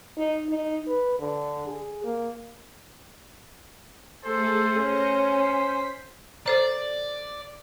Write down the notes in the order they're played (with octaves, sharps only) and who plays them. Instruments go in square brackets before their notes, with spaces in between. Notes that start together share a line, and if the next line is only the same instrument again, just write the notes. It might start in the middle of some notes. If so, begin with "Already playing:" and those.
[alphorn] D#4
D#4
B4
D3
G#4
A#3
[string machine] A3 G#4 [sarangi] A4 [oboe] C5
[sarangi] C#4 [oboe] C5 [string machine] F6 G6 A#6
[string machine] B6
[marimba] A4 C5 A#5 [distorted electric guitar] D5